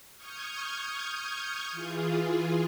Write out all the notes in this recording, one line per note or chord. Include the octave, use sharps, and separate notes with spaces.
C#6 D#6 F6 G6 G#6
E3 F4 G#4